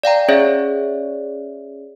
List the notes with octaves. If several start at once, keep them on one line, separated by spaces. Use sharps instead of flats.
D5 F5 G5 A#5
C#4 G#4 C#5 D5 E5